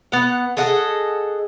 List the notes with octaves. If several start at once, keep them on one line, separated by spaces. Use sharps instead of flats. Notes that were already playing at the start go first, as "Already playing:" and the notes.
B3 F#5
G#4 A4 D#5 F#5